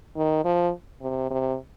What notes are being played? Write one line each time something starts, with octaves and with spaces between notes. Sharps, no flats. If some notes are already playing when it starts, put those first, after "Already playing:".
D#3
F3
C3
C3